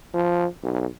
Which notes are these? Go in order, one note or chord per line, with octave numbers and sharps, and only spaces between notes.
F3
B1